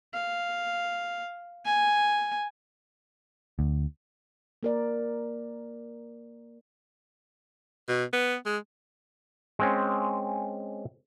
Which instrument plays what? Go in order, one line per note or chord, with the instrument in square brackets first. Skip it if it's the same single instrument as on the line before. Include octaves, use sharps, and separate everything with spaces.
[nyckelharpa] F5
G#5
[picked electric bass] D2
[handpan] A#3 A#4 D5
[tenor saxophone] B2
B3
G#3
[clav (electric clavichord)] G#3 C4 C#4